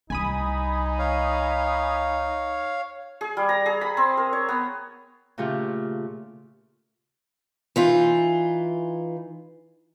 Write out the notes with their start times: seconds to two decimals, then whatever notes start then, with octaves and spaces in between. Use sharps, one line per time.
0.10 C2 D#4 G#5 B5 D#6
0.99 C#5 F5
3.21 G#4
3.37 G3
3.49 A#5
3.66 G#4
3.81 B5
3.97 C4
4.17 A#4
4.33 C#5
4.49 B3
5.38 A#2 C#3 A3 F4 G4
7.76 E3 D#4 F4